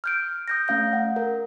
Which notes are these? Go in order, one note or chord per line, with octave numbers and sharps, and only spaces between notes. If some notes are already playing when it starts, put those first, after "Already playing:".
F6 G6 D7
D#6 G6 A#6
A3 C#4 F5 G6
F#5
A#4